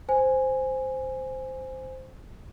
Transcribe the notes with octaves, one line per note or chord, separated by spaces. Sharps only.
C5 G#5